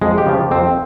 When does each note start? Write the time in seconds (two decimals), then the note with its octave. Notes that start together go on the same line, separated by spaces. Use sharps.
0.01 F2 G#3
0.18 G4
0.26 C#3 F3
0.51 F2 C4